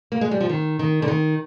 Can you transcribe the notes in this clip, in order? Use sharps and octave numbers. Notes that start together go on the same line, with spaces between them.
A#3
G#3
G3
F3
D#3
D#3
D3
D#3